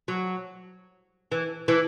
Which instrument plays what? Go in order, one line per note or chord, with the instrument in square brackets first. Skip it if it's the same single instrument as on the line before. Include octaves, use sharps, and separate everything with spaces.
[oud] F#3
E3
E3